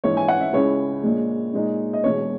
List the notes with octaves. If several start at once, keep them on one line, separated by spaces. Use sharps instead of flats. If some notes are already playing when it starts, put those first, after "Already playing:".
A#1 G#2 E3 G#3 C#5
G#5
F#5
E5
C#2 C#3 G#3 C#4 E4 C#5
A#1 A#2 G#3
A#2 G#3 D#4
D#5
E1 E2 B2 G#3 C#5